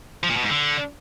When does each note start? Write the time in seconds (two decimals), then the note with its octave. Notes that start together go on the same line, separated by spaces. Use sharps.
0.23 F3
0.30 A#2
0.36 B2
0.43 G#2
0.50 D3